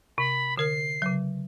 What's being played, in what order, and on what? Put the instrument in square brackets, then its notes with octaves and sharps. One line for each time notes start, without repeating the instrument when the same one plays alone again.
[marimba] C3 [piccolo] B5
[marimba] D3 A#4 F6 [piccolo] C7
[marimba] C#3 F#3